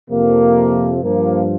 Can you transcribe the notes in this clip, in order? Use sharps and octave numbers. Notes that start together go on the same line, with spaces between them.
F2 C3 F3 A#3
G2 F3 A#3